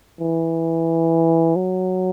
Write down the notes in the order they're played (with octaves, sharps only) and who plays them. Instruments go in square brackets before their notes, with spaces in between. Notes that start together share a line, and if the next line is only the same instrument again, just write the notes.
[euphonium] E3
F#3